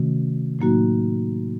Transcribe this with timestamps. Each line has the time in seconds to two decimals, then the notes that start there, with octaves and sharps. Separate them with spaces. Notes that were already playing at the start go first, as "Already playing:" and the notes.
Already playing: C3 D#3 A3 C#4 F#4
0.59 A2 F#3 A#3 D#4 F#4